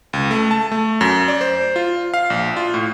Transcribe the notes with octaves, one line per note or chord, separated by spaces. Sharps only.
C#2
A3
A5
A3
F#2
D5
C5
F4
F5
A#1
F4
A2